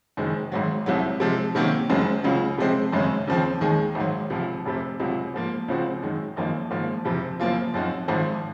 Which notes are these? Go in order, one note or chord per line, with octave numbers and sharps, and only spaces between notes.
F#1 F#2 D#3 G#3
G#1 G#2 F#3
C2 C3 F#3
C3 F3 G#3
C3 D#3 F#3 A#3 C#4
F#1 F#2 C#3 G#3
C#2 C#3 F#3
C3 F3 G#3 C4
G#1 F#2 C#3 G#3 C#4
D#2 C#3 F3 C4
D#2 D#3 G#3 D#4 G#4
G#1 G#2 F#3
C#2 C3 F3
F1 F2 C3 F3
C#2 C3 F#3
G#2 F3 A#3
C#2 C#3 F3 C4 F#4
F#2 D#3 G#3 D#4
G#1 F#2 F3 A#3 D#4
G#1 G#2 F3 A#3
F#1 F2 C3 F3
F#1 F#2 F3 A#3 F4
F#2 F3 C4 D#4 F#4
G#1 G#2 F3